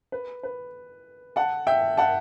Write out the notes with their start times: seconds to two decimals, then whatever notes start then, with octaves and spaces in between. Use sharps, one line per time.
0.12 B4
0.43 B4
1.36 F#5 A5
1.67 E5 G5
1.97 F#5 A5